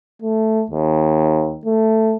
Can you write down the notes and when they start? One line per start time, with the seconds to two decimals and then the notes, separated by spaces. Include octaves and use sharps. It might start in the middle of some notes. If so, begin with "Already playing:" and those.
0.22 A3
0.70 D#2
1.66 A3